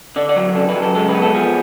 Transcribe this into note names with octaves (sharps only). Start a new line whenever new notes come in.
D3 D5
D5
F#3
C#3 A4
B4
F#3
A4
G#3 A4
B4
B3
A4
F3 G#4